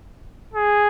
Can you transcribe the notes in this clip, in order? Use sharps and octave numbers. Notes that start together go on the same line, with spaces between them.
G#4